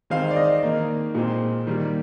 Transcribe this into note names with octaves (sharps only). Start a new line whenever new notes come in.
D#3 G#3 C4 F5
D5
D#5
D#3 A#3
A#2 G#3 C4
D#3 G3 A#3